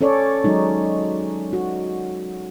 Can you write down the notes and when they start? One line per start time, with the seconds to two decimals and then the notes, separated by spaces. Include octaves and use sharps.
0.01 C#4 A4 C#5 D5
0.44 F#3 G#3 D#4
1.53 F#4